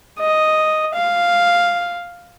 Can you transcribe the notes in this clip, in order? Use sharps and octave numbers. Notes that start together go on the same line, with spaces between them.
D#5
F5